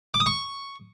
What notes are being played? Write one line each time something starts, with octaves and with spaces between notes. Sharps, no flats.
D6
D#6
C#6